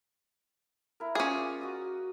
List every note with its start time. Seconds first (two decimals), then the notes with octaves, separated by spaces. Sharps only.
1.00 E4 A#4
1.15 C#4 F4 G#4 D5 D6
1.61 F#4 D#5